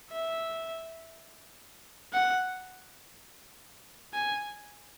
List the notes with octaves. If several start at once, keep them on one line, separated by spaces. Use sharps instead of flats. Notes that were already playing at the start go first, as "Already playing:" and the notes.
E5
F#5
G#5